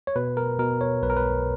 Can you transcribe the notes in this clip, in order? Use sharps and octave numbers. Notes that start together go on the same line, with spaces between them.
C#5
B2 B4
A#4
B2 A#4
C#5
B1 B4
A#4
B4